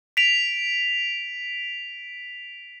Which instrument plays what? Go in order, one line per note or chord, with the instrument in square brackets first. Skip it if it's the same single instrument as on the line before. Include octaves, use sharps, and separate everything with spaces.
[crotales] B6 D7 F7